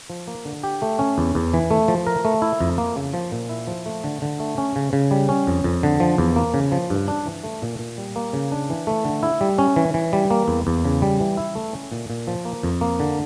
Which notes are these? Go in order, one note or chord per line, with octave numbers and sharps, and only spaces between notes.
F3
A#3
D3
G4
A3
C#4
E2
E2
E3
A3
F3
A#4
A3
E4
F2
A#3
C#3
F3
A#2
E4
F3
A3
D3
D3
A3
C#4
C#3
C#3
G3
C#4
F2
F2
D3
F3
E2
A#3
C#3
F3
G2
D4
E3
A3
A#2
A#2
G3
A#3
C#3
D4
E3
A3
D3
E4
G3
C#4
E3
E3
G3
A#3
E2
E2
C#3
G3
E3
E4
A3
C#4
A#2
A#2
F3
A#3
F2
A#3
D3